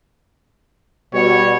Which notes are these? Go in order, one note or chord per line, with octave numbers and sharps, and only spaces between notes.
B2 G3 C#5